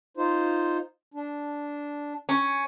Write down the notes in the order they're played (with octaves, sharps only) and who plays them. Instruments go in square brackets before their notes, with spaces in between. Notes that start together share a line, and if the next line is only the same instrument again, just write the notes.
[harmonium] D#4 F4 C5
D4
[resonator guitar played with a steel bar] C#4